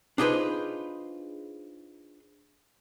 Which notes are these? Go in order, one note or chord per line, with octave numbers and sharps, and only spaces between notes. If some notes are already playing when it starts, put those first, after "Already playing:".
D4 D#4 F4 G#4 B4 C5